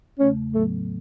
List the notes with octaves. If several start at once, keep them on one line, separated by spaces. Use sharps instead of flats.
E2 C#3 A3 C#4
A2 F#3 A3 B3 A4